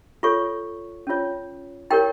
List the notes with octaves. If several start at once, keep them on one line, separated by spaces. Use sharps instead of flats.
F4 A4 C#5 C#6
C#4 F4 C#5
E4 G4 A#4 C#5 G5